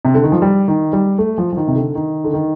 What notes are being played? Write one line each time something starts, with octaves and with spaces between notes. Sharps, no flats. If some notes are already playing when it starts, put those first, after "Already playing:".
C3
D3
D#3
F3
G3
D#3
G3
A3
F3
F3
D#3
C3
D3
D#3
D3
D#3